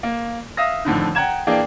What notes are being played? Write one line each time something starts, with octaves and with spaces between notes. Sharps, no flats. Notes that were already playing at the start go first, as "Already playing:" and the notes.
A#3
E5 F5 D#6 A#6
F2 A2 D3 D#3
F#5 G5 A#5 G#6 E7
E3 A#3 D4 G#4 G5